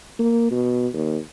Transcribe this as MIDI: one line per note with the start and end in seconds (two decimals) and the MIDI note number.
0.19 0.49 58
0.51 0.87 47
0.93 1.18 39